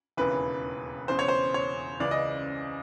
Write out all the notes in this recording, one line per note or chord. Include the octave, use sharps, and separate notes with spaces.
E1 D#2 C#3 E3 B4
E1 E2 C#3 E3 C5
C#5
C5
C#5
C#2 C#3 E3 D5
D#5